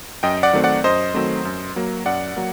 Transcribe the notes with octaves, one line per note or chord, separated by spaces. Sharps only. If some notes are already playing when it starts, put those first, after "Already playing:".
F#2 D#5 G5
D5 F#5
D#3 F#3 A3 C4
D5 F#5
F#2 C5 D#5
D#3 F#3 A3 C4
F#2
F#3 A#3
F#2 D5 F#5
F#3 A#3